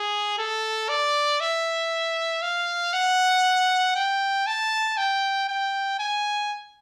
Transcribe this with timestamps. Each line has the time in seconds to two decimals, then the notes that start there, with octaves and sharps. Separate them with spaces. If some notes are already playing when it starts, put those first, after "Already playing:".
Already playing: G#4
0.38 A4
0.89 D5
1.40 E5
2.42 F5
2.93 F#5
3.96 G5
4.47 A5
4.97 G5
5.48 G5
5.99 G#5